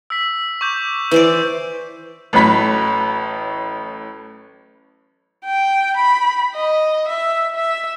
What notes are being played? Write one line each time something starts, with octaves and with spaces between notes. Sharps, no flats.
E6 B6
C#6 D6 G6
E3 C5 D5 E6
A1 A2 F#3 B5 B6
G5
B5
D#5
E5
E5